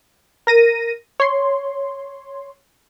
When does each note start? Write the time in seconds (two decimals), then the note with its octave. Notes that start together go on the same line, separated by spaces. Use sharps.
0.47 A#4 A#6 D#7
1.20 C#5 C6